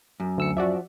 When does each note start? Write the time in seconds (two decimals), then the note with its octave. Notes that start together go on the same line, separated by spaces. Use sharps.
0.20 F#2
0.38 D2 E6 C#7
0.57 F3 F#4 D5 E5